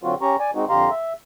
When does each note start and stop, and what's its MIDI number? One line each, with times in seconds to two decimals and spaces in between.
0.04 0.15 50
0.04 0.15 54
0.04 0.15 60
0.04 0.15 65
0.04 0.15 66
0.21 0.36 61
0.21 0.36 67
0.21 0.36 82
0.21 0.36 85
0.40 0.51 74
0.40 0.51 80
0.55 0.65 56
0.55 0.65 60
0.55 0.65 63
0.55 0.65 66
0.69 0.90 41
0.69 0.90 50
0.69 0.90 67
0.69 0.90 77
0.69 0.90 82
0.69 0.90 84
0.90 1.13 76